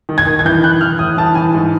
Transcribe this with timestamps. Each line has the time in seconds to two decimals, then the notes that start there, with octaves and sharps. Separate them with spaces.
0.09 D#3
0.18 G#6
0.27 D#3
0.39 G#6
0.45 E3 G6
0.64 E3 F#6
0.81 E3 F6
0.99 A2 D#6
1.17 E3 A5
1.35 E3 G#5
1.54 G#2